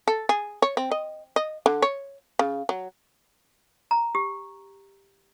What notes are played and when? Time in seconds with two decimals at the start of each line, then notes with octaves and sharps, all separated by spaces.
0.08 A4
0.29 G#4
0.62 C#5
0.77 C4
0.91 D#5
1.36 D#5
1.66 D3
1.82 C#5
2.39 C#3
2.69 F#3
3.91 A#5
4.15 G4